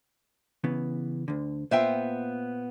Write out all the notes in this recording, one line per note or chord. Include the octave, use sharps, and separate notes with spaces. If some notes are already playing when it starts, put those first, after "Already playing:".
C#3 E3 B3
D2 D3
A#2 B3 F4 C5 E5 G5